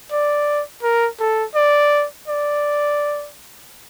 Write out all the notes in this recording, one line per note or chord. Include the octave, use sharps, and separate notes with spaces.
D5
A#4
A4
D5
D5